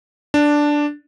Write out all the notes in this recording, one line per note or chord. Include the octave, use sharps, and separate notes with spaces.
D4